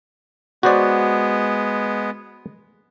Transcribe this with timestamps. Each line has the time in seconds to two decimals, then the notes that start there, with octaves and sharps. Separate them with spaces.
0.63 G#3 B3 F#4 C5 D5